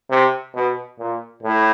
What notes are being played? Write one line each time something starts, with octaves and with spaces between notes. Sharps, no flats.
C3
B2
A#2
A2